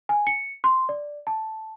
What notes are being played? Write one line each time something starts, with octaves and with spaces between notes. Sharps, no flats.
G#5
C#7
C6
D5
A5